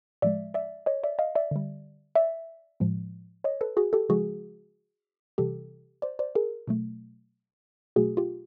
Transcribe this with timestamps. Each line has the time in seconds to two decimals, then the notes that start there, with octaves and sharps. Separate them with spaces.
0.22 A2 F3 G#3 D5 E5
0.54 D5 E5
0.86 C#5 D#5
1.03 D5 E5
1.19 D#5 F5
1.35 D5 E5
1.51 D3 G3
2.15 D5 E5
2.80 A2 F3 G#3
3.44 C#5 D#5
3.61 A4 B4
3.77 F#4 G#4
3.93 G4 A4
4.09 C#3 F3 G#3 F#4 G#4
5.38 C3 E3 G3 G4 A4
6.02 C5 D5
6.19 C5 D5
6.35 G#4 A#4
6.67 B2 F#3 A3
7.96 B2 F#3 A3 F#4 G#4
8.17 F4 G4